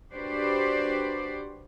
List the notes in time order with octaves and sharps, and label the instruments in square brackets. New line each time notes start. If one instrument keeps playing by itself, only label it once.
[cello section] D4 F#4 G4 B4 C5 D5